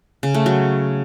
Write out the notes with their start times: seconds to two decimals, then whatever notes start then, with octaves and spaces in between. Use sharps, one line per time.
0.23 C#3
0.34 A3
0.46 F#3